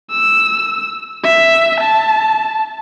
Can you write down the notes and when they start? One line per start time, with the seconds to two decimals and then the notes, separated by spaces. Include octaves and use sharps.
0.11 E6
1.24 E5
1.80 A5